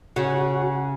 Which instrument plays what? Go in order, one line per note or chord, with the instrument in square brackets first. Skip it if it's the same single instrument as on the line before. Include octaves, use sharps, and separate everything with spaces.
[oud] C#3 [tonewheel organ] F#4
[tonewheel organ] F#4